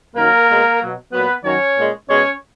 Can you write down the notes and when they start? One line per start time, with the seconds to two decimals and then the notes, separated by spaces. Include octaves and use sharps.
0.16 F#2 D#3 F#3 A#3 A#4
0.48 B2 G#3
0.81 B2 F#3
1.12 A#2 F#3 B3 B4
1.44 F#2 D#3 F#3 C#4 C#5
1.77 A#2 G#3
2.09 B2 G#3 C#4 C#5